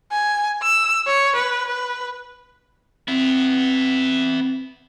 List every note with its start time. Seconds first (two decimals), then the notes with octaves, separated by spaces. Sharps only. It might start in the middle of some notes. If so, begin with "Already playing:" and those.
0.11 G#5
0.63 E6
1.06 C#5
1.36 B4
1.67 B4
3.08 B3 C4 E4